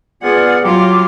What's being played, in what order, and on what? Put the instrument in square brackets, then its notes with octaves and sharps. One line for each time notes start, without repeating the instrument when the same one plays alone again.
[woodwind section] B3 F4 D5 [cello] G#4 F#5
[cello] F#3 F4 [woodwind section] G4 D6